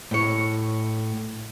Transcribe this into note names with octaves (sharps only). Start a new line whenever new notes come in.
A2 C#5